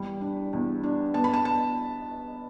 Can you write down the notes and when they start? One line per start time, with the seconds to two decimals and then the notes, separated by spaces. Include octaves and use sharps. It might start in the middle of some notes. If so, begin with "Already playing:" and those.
Already playing: E2 G3 B5
0.21 D4
0.53 E2
0.83 D4
1.14 B3 A5
1.24 B5
1.34 A5
1.45 A5